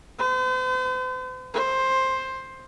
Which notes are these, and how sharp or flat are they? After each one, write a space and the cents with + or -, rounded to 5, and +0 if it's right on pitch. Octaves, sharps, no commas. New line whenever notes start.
C5 -45
C5 +10